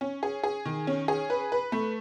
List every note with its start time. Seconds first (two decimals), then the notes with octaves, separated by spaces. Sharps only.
0.01 C#4
0.23 G#4
0.43 G#4
0.65 D#3
0.87 C#4
1.08 G#4
1.30 B4
1.52 B4
1.72 A3